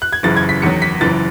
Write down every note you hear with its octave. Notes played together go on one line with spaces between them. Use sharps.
F#6
G#6
F#1 F#2 C#3 E3 A6
G#6
B6
E2 D#3 F#3 C#7
B6
F#1 F#2 E3 A6